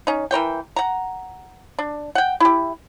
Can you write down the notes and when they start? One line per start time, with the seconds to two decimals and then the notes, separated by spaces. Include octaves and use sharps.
0.07 C#4 D#4
0.31 E3 A#4 C#5 G5
0.76 F#5 A#5
1.79 D4
2.15 F#5 G5
2.40 E4 G4